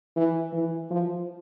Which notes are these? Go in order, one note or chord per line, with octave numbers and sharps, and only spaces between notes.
E3
E3
F3